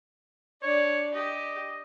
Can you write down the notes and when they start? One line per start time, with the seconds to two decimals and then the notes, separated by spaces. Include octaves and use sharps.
0.63 D4 C#5 D5
1.15 G4 D#5